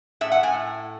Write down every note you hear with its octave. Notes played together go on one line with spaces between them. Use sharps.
A2 E5
F#5
A2 G#5